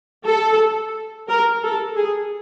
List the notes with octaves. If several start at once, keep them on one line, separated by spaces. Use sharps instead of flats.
A4
A#4
A4
G#4